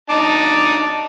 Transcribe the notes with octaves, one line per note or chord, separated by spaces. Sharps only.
D#4 A5 D6